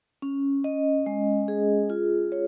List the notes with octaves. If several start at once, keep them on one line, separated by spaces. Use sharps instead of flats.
C#4
D#5
G#3
G#4
F4
C#5